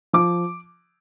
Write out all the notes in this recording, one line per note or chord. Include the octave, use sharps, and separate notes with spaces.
F3 D6